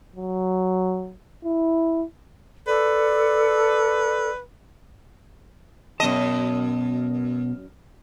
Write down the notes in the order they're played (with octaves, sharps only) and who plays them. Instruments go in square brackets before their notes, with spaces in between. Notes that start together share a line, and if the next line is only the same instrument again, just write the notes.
[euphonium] F#3
E4
[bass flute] A4 [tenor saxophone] B4 [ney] D5
[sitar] F#2 D#5 [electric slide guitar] B2 A5